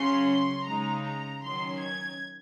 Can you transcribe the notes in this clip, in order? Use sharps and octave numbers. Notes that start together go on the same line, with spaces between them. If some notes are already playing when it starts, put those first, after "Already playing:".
Already playing: C#3 F#3 C#4 C6
C6
C#3 G#3 D#4 A#5
A#5
D#3 F#3 C#4 C6
G#6